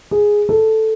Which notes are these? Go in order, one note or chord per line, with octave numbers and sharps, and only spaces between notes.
G#4
A4